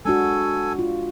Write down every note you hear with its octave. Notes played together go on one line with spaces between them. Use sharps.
G#3 D4 F#4 A4 G#5
F4